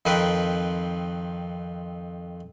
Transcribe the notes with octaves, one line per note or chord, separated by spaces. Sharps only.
F2 D#3 C4 A#4 B4